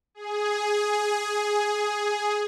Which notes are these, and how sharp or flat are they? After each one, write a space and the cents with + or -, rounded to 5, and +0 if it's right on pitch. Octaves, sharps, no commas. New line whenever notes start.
G#4 +5